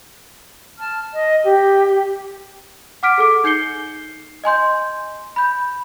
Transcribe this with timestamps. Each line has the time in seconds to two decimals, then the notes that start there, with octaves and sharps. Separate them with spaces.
0.78 A5 F6
1.13 D#5
1.45 G4
3.03 F#5 D6 F6 B6 D7
3.18 G#4 A4 D6
3.44 D#4 G6 C7 C#7 G7
4.44 D#5 G#5 C6 G6
5.36 B5 G6